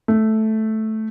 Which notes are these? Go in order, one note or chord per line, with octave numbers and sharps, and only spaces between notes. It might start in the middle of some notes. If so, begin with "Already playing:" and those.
A3